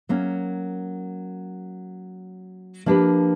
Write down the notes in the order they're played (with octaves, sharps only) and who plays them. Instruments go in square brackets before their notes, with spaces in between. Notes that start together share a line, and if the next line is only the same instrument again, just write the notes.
[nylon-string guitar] F#3 A#3 C#4
F3 A#3 D4 G4 B4